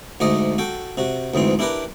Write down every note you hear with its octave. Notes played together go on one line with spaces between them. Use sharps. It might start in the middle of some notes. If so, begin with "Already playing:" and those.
D2 G#2 A3 D5 D#5
F#4 A4 G5
C3 F#4
D2 G#2 E3 C4
D4 E4 G4 A#4 B4 D6